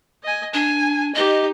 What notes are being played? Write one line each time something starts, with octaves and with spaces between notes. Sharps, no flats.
D#5 G#5
D4 G#5
D#4 G4 D#5